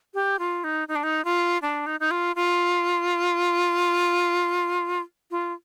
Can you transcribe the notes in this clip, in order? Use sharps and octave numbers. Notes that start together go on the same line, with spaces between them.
G4
F4
D#4
D#4
D4
D#4
F4
D4
D#4
D#4
F4
F4
F4